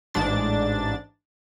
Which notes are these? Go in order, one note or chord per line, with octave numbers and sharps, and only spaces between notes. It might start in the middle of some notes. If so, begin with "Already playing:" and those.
A1 G#2 D4 A6